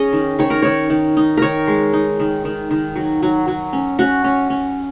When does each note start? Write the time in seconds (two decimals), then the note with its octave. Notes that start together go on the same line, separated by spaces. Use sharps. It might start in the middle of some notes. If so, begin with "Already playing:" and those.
Already playing: C#4 G#4 C#5 D#5
0.13 D#3
0.39 D#3 C#5
0.50 A#4
0.62 D#3 C#5
0.90 D#3
1.17 D#4
1.37 D#3 A#4 C#5
1.67 G#3
1.93 D#4
2.20 D#3
2.45 D#3
2.71 D#3
2.96 F#3
3.23 F#3
3.48 F#3
3.73 C#4
3.99 C#4 F#4
4.24 C#4
4.50 C#4